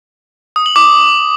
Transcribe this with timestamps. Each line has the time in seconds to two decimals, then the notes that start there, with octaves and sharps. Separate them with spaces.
0.56 D#6
0.66 F#7
0.76 D6